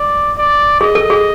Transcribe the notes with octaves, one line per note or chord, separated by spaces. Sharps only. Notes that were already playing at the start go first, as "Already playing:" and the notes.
Already playing: D5
D5
G#4 D#5
A4
G#4